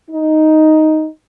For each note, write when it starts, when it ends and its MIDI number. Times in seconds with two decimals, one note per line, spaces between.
0.11 1.07 63